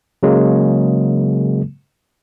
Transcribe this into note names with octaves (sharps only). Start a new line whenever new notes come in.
C#3 F#3 G#3 A#3